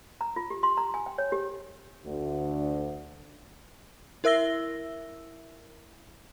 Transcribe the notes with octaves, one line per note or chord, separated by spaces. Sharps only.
A#5
F4
G4
C6
A#5
G#5
G5
C#5
G4
D2
E4 A#4 E5 E6 A#6 G7